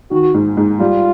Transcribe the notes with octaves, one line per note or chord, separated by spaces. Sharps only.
D#3 F#4
G#2
G#2
G3 F4